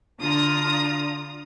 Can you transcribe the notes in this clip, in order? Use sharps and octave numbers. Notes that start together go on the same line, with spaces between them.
D3 D4 F4 A#5 D#6